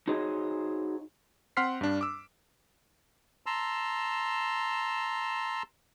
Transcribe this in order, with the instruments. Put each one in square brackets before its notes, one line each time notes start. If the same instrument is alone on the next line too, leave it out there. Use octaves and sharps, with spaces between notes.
[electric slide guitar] D#4 F#4 G#4 C5 C#5 D#5
[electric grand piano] C4 F#5 C6 F6 B6 C7
G2 D4
D6 E6
[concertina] A5 A#5 C6 E6